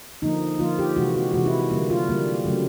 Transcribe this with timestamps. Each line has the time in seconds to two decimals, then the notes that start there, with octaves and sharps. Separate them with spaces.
0.22 D3 F3 A#3 D#4
0.59 D3 F3 A#3 F4
0.79 G4
0.97 C3 E3 G#3 F#4
1.16 F#4
1.33 C3 E3 G#3 F#4
1.46 E4
1.71 D3 G3 A#3
1.90 F4
2.09 D3 G3 A#3
2.45 C#3 F#3 A3